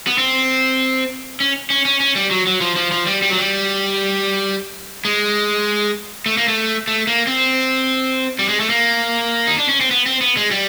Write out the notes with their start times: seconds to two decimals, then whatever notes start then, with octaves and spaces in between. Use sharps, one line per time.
0.07 B3
0.18 C4
1.40 C#4
1.70 C#4
1.85 C#4
2.00 C#4
2.16 G3
2.31 F#3
2.47 F#3
2.61 F3
2.76 F3
2.92 F3
3.06 G3
3.22 G3
3.30 F#3
3.38 G3
5.05 G#3
6.26 A3
6.37 A#3
6.48 A3
6.87 A3
7.07 A#3
7.27 C4
8.39 G3
8.49 G#3
8.60 A3
8.70 A#3
9.47 D#4
9.58 D4
9.69 C#4
9.81 C4
9.91 B3
10.06 C4
10.21 B3
10.37 G#3
10.51 G3